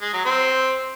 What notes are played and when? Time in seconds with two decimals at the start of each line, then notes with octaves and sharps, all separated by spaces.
0.02 G#3
0.13 F#3
0.25 C4